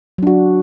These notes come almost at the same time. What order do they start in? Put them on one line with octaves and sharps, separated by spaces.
F#3 D4 F#4